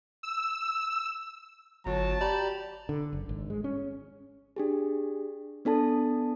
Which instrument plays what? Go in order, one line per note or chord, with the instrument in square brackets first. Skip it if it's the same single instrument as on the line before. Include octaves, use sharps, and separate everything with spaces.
[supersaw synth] E6
[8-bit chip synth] G1 [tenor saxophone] F#3 [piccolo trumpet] A5
[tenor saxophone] G4 [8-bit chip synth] D5 A#5 B5
[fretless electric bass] D3
F#1
G#1
G#3
C#4
[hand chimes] D4 G4 G#4
B3 D4 A4 A5